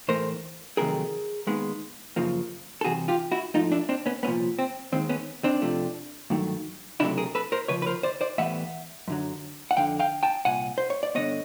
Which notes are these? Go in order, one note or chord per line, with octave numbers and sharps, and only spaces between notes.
A2 E3 A3 A#4 C5
F2 C3 D#3 F#3 A3 G#4 A#4
D#2 D#3 G#3 B3
F#2 C#3 F3 A#3
A4
C2 C3 E3 F#4 G#4
F4 G4
E4 F#4
G#2 F3 A3 D#4 F4
D4 E4
C4 D4
B3 C#4
C2 A#2 F3 B3 C#4
C4
D#2 D#3 G#3 C4
B3 C#4
C4 D4
F2 C3 F3 A3
G2 D#3 F#3 A3
C#2 C3 D#3 F#3 A3 D4 E4
G#4 A#4
A4 B4
A#4 C5
D2 C#3 F3 B4 C#5
B4
A#4 C5
C5 D5
C5 D5
A2 E3 G3 B3 E5 F#5
F#2 D3 F#3
F#5
F2 D3 F3 F5 G5
F5 G5
G5 A5
C2 A#2 F#5 G#5
C5
C#5
D5
G2 D3 G3 B3 C#5 D#5